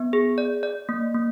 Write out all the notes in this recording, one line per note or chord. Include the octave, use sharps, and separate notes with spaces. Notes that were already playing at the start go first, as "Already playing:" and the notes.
Already playing: B3
G#4
D5
D5
A#3
A#3